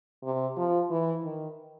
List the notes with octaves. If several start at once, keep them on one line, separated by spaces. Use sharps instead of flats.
C3
F3
E3
D#3